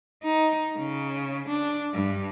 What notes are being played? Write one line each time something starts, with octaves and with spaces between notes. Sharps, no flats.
D#4
C#3
D4
G2